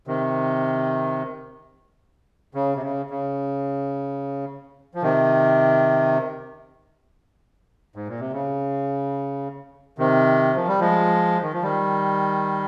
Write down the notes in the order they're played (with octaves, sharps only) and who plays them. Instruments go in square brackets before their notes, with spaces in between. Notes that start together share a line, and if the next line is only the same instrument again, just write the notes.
[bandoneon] C3 D#3
C#3
C3
C#3
C#3
F3
C3 D#3
G#2
A#2
C3
C#3
C3 D#3
F3
G3
F3 G#3
D#3
F3
D#3 G3